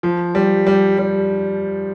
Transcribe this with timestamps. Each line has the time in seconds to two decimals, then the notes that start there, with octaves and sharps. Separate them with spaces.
0.03 F3
0.35 G3
0.66 G3
0.98 G3